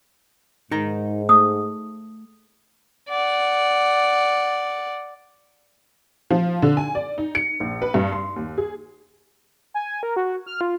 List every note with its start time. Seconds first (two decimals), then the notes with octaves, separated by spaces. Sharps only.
0.71 G#2 D#4 A#4 A#5
1.29 A3 D#6
3.10 D5 F#5
6.30 F3
6.62 D3
6.77 G#5
6.95 D5
7.18 D#4
7.35 C#7
7.60 A#1
7.82 B4
7.94 G2
8.12 C6
8.36 D#2
8.58 G#4
9.74 G#5
10.03 A#4
10.16 F#4
10.46 F6
10.61 F4